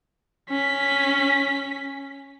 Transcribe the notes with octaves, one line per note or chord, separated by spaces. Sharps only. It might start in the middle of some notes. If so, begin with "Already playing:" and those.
C#4 B6